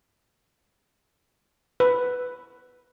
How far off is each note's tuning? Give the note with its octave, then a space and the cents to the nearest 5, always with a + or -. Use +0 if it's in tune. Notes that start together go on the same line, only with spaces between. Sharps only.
B4 +5